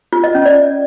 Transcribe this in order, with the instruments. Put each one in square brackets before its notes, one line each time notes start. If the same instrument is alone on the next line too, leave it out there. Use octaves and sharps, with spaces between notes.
[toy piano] F4
D#5
C#4
D5